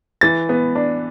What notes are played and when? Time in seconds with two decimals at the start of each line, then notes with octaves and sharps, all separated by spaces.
0.21 E3 A6
0.49 B3
0.75 D4